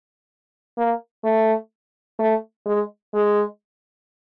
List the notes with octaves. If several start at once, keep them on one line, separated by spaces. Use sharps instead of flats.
A#3
A3
A3
G#3
G#3